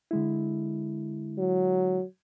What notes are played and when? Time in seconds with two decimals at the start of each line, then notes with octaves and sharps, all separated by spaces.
0.11 D3 G#3 E4
1.38 F#3